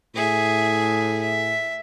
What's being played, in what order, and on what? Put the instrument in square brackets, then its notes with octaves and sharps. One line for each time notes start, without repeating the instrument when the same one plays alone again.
[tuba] A2 [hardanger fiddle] G#4 E5
[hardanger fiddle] E5